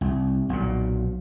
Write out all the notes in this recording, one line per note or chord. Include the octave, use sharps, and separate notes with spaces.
C2
B1 A#2